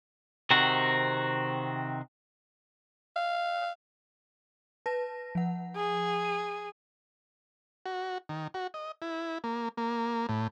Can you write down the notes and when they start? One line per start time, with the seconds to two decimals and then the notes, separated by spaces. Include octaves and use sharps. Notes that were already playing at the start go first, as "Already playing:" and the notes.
0.51 C3 D#3 C4 F#4
3.16 F5
4.86 B4 A5 A#6
5.35 F3 F#5
5.76 G#4
6.25 D#7
7.86 F#4
8.29 D#3
8.54 F#4
8.74 D#5
9.02 E4
9.44 A#3
9.77 A#3
10.29 A2